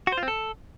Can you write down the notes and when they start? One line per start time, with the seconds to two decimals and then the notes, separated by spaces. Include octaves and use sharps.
0.07 F#4
0.12 C5
0.18 F4
0.23 C4
0.28 A4